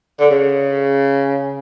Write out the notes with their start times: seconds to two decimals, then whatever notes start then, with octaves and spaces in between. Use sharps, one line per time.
0.19 D3
0.31 C#3